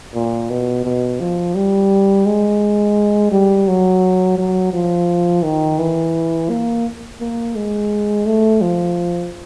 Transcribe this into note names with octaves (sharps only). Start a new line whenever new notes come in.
A#2
B2
B2
F3
G3
G#3
G3
F#3
F#3
F3
D#3
E3
A#3
A#3
G#3
A3
F3